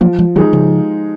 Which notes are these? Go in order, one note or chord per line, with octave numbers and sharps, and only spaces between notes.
F3 F#3 A#3
F3 G#3
D#3 F#3 G#3 D#4 G#4
C#3 F3